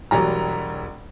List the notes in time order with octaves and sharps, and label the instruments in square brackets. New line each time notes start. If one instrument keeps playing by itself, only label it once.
[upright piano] E1 F#3 G3 A#5